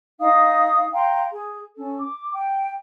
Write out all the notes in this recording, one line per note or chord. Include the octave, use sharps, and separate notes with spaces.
D#4 F5 D#6
F5 G5 A#5 C6
G#4
C#4 A4
D6
G5